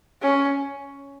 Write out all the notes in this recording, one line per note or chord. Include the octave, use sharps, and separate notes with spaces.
C#4